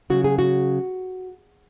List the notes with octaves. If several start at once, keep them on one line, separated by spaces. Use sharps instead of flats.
C#3 F#3 F#4
G#4
F#4